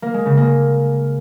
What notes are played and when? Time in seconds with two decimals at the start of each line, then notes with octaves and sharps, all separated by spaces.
0.02 A#3
0.14 G#3
0.26 C#3
0.37 A#3